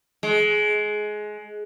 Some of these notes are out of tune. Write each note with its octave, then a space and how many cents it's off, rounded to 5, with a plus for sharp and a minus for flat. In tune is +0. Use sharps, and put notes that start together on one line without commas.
G#3 +20